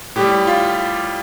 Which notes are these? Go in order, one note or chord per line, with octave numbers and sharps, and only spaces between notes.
A2 G3 G4
F4